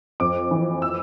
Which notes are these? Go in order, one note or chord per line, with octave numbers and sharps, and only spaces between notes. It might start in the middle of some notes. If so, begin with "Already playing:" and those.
F2 D6
E3
E6